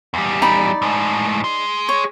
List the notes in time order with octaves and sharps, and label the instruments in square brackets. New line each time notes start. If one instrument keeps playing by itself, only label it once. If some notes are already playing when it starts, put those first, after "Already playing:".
[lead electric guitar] E2 G3
[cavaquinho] D#4 D5 B5
[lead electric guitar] A2 G#3
G#4 C6
[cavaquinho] C#5